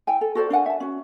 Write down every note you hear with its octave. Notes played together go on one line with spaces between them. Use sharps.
E4 G5 G#5
A4
F#4 A4 C5 D5
D4 A#4 F#5 G#5
E5 A5
C#4 F#4